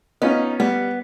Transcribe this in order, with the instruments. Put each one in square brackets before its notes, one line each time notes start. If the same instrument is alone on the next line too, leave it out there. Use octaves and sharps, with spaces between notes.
[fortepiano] B3 C#4 F4 [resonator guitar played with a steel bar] D#4
[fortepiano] G3 [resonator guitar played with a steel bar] B3